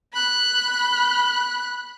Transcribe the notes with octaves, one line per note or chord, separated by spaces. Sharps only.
B5 F#6